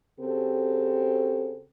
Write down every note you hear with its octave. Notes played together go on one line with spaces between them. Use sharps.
C#3 C4 F#4 G4 A4